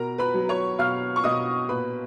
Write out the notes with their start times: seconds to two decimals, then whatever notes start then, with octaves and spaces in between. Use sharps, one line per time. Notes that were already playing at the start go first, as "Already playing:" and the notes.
Already playing: B2 A#4 A#5
0.18 B4 B5
0.34 F#3
0.49 C#5 C#6
0.78 B2 F5 F6
1.16 C#6
1.24 B2 D#5 D#6
1.69 A#2 B4 B5